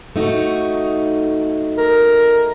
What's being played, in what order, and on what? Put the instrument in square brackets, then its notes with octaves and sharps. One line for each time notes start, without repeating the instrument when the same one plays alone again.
[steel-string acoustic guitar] A3 D#4 F#4
[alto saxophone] A#4